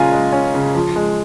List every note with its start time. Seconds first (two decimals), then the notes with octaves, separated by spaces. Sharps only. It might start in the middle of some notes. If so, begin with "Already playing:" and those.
Already playing: C#3 G#3 C#4 F4 G#5 A#5
0.12 G#3
0.32 C#4
0.54 C#3
0.75 F3
0.96 G#3